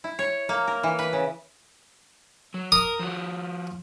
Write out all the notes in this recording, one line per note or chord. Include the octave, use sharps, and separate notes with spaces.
E4
C#5
A#3
A#4
E3
B4
C#3
F#3
A#4 D#6
F3 F#4